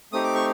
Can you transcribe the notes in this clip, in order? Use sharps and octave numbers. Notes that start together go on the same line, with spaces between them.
A3 C4 D#4 G4 D#6
D6
C#6